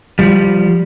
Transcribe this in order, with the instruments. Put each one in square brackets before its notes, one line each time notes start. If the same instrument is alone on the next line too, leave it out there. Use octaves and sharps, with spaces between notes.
[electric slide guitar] F3 G3